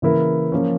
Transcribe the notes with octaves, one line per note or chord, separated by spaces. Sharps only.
C#3 E3 A#3 E4 A#4
F3 A#3 C#4